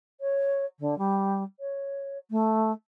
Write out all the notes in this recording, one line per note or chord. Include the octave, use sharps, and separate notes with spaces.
C#5
D3
G3
C#5
A3